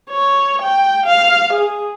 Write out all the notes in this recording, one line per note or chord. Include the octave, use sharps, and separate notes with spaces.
C#5
G5
F5
G#4